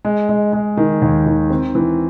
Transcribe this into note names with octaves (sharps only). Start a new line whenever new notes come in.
G#3
G#3
G#3
D#3
D#2
D#3
C4
E3